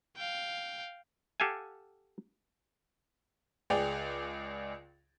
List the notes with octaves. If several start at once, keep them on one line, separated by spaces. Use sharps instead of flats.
F5 G5
G4 A4 F5 F#5 G#5
C#2 G#4 D5 G5 F7